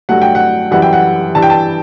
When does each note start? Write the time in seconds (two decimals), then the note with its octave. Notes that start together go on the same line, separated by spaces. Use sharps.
0.09 G2 F#3 A3 F#5
0.22 G5
0.35 F#5
0.71 F#2 E3 G3 F#5
0.82 G5
0.93 F#5
1.35 G2 E3 G3 A5
1.42 G5
1.50 A5